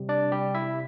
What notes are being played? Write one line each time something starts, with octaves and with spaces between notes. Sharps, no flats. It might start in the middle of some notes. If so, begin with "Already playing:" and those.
Already playing: C3 G3
D4 D5
G3 G4
E4 E5